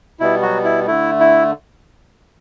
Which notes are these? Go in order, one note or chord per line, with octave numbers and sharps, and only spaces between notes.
B2 G3 B3 E4
F#3 F#4
E4
D3 A3 E4
E4